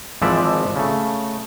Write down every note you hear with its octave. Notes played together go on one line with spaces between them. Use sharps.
G#1 E3 F3 G#3 D5 E5
C#3 A3